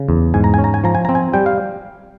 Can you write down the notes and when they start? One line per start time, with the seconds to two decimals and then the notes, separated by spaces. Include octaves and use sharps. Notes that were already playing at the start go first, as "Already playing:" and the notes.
Already playing: C#3
0.09 E2
0.34 G#2 G#5
0.44 A#5
0.54 C#4 G#5
0.64 A#5
0.74 G#5
0.84 F3 A#5
0.95 G#5
1.05 C4 A#5
1.15 G#5
1.34 G3 G5
1.46 F5